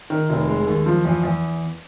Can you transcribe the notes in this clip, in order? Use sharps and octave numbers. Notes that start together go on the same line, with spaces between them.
D#3
F1
G#3
D#2
F3
E2
E2